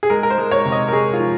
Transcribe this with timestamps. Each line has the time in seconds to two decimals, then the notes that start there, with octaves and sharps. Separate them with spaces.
0.03 G#4
0.10 G#3 A#4
0.23 A#4
0.30 C5
0.38 G#3
0.51 C#5
0.65 C3
0.72 D#5
0.88 A#4
0.93 G#3 G#4
1.13 F4
1.20 F3